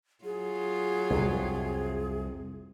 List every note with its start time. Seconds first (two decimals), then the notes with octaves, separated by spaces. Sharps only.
0.24 F#3 F4 G#4
1.10 C2 F2 C3